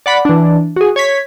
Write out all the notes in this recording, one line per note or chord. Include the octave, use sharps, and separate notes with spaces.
D5 F#5 B5
E3 D4
F#4 G#4
C#5 G#6 B6